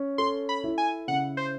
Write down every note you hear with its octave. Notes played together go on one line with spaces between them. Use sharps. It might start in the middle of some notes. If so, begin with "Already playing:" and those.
Already playing: C#4
A4 C6
B5
E4
G#5
C#3 F#5
C5